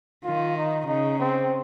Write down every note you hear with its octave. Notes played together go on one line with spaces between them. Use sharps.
D#3 F4
D#4
C#3 D#4
C4